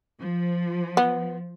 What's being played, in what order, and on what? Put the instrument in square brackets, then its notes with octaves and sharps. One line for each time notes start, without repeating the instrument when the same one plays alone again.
[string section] F3
[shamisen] B3